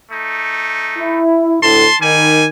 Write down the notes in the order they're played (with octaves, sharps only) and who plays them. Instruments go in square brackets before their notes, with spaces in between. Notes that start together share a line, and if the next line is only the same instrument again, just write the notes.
[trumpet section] A3 D#4
[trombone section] E4
[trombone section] D2 A2 [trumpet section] A5 C6
[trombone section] D#3 [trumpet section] G3 G#5